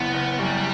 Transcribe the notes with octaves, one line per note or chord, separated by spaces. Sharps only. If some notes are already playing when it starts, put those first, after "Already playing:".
Already playing: F#1 E3 B3
F#1
F#2 G3